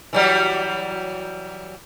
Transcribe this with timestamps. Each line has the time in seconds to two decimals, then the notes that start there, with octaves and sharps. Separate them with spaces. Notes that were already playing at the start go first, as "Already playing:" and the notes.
0.13 E3 F#3 G3